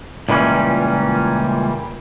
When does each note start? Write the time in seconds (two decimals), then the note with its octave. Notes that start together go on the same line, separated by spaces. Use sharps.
0.29 C#2 A#2 E3 G3 C#4